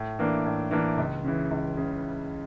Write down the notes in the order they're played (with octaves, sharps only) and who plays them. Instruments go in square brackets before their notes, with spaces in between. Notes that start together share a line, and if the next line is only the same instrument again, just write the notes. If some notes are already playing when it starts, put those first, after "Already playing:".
Already playing: [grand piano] A2
E3 A#3 D4
A2
E3 A#3 D4
C#2
C#3 E3
C#2
C#3 E3